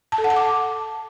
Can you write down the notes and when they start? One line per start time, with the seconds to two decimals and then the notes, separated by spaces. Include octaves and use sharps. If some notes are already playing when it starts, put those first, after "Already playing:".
0.12 A5
0.18 A4
0.24 F#5
0.30 A5
0.36 D6